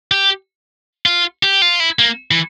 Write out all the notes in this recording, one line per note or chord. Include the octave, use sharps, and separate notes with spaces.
G4
F4
G4
F4
E4
A#3
E3